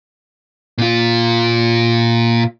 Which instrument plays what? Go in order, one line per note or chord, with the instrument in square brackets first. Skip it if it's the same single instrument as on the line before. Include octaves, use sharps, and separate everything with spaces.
[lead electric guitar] A#2 F4